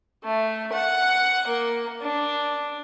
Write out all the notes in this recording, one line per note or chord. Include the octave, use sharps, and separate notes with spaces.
A3
F#5
A#3
D4